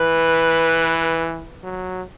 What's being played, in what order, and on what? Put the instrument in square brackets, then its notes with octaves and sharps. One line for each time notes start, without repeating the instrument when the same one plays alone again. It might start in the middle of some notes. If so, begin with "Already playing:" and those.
Already playing: [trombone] E3 [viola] B4
[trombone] F#3